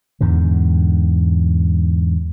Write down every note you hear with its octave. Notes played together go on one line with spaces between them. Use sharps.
E2 G#2 D3